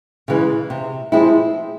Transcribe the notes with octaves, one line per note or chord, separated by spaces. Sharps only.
C#3 E3 G#3
C3
F3 G#3 C4 E4